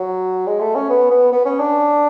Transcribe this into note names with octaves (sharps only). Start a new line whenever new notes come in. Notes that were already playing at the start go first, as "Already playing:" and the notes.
Already playing: F#3
G#3
A3
C#4
B3
B3
B3
C#4
D4